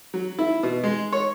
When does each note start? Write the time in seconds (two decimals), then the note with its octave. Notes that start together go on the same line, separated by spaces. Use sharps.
0.14 F#3
0.39 E4
0.63 B2
0.84 G#3
1.13 C#5